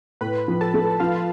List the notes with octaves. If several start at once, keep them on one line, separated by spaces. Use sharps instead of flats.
A2 B4 B5
F3
A4 A5
A3
F3 F4 F5